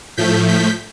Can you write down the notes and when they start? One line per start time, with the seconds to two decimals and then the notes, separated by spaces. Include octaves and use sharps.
0.17 A2 F3 A3 G6 B6
0.48 G6 B6